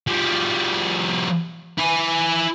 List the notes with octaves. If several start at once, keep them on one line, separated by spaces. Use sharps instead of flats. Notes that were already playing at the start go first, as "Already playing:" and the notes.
F3 G3
E4 G#5